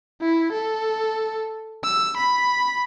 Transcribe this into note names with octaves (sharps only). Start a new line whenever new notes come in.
E4
A4
E6
B5